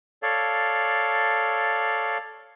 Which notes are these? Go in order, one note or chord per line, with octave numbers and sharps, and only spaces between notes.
A4 C#5 D5 F5